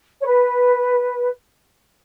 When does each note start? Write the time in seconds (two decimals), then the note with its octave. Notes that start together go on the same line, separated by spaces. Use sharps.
0.21 C#5
0.26 B4